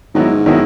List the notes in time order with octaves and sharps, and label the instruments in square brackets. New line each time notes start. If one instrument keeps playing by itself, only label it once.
[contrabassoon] G#2 [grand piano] D#3 F#3 B3 E4
[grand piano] D#3 F#3 B3 E4